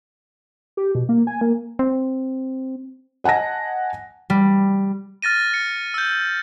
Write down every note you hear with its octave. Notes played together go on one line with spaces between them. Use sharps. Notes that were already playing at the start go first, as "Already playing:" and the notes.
G4
B2
A#3
G#5
A#3
C4
D#5 F#5 G#5 A5 A#6
G3
F6 A6 A#6 D#7
C#7
E6 G6